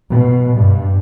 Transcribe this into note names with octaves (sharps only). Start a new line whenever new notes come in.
B2
G2